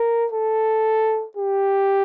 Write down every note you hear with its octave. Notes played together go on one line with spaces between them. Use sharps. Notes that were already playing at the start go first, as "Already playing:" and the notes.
Already playing: A#4
A4
G4